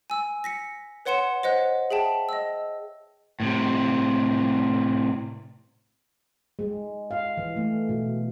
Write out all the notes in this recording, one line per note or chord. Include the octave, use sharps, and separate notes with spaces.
G#5 E6
A#6 B6 C#7
B4 C#5 F#5 C6 C#7 E7
C5 D#5 F#5 F#6
G#4 E5 G5 A5
D#5 E6
A2 C3
G#3
F5
E3
A3
B2